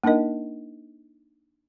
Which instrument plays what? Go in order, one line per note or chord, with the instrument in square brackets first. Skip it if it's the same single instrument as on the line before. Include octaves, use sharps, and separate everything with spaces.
[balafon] A#3 D4 D#4 A#4 D#5